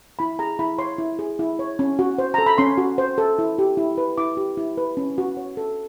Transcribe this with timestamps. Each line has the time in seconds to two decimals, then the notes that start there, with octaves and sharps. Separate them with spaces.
0.19 E4 B5
0.39 G#4 A#5
0.59 E4 B5
0.78 C#5 C6
0.98 E4
1.19 G#4
1.39 E4
1.59 C#5
1.79 C#4
1.99 F#4
2.18 C5
2.34 A4 A#5
2.46 B5
2.58 C#4 C6
2.78 F#4
2.98 C5
3.18 A4
3.39 E4
3.59 G4
3.77 E4
3.98 B4
4.18 E4 D6
4.37 G4
4.57 E4
4.77 B4
4.97 C#4
5.18 F#4
5.37 C#5
5.57 A4